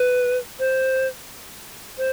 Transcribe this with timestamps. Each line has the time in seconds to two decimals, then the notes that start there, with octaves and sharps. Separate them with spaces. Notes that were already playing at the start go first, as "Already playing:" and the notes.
Already playing: B4
0.59 C5
1.97 C5